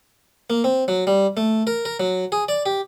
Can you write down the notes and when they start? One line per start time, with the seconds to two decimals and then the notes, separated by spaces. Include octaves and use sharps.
0.50 A#3
0.64 C4
0.88 F#3
1.07 G3
1.37 A3
1.67 A#4
1.85 A#4
2.00 F#3
2.32 G#4
2.49 D5
2.66 G4